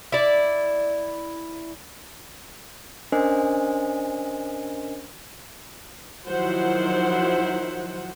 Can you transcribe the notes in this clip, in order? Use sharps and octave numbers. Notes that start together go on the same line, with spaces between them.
E4 D5
C#4 D4 A#4 C5 D#5 G#5
D#3 F3 F#3 E4 C5 F#5